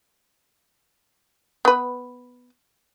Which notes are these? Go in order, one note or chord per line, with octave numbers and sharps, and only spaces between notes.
B3 B4